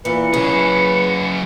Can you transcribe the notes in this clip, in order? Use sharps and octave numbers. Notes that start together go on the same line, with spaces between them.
E2 A#2 E3 B4 C#7
C#3 F#3 G#4